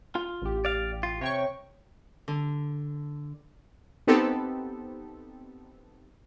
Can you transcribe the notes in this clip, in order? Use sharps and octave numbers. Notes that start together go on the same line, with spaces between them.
F4
A1 G4
D5 F5
F4
C3 C#5 G5 C#6
D3
B3 C4 D#4 G4 A4